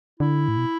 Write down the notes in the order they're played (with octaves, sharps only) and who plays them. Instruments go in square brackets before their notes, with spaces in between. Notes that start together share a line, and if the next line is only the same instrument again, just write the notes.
[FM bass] D3 [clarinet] E4
[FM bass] A2
B2